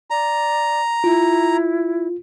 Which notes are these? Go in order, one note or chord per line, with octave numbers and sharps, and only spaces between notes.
D5 A#5
E4 F4